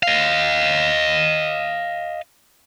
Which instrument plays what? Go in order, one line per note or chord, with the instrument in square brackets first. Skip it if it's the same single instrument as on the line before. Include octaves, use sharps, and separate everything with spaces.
[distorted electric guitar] D#5 F5